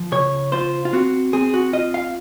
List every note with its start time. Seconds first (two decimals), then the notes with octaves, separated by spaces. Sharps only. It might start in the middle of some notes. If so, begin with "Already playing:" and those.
Already playing: F3
0.12 C#3 C#5
0.52 F4 C5
0.85 F4
0.93 C4 F#4
1.33 C4 G#4
1.54 F#4
1.73 F4 D#5
1.94 F5